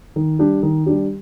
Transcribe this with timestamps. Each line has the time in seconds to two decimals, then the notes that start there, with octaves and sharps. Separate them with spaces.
0.16 D#3
0.39 G3 D4 G4
0.63 D#3
0.86 G3 D4 G4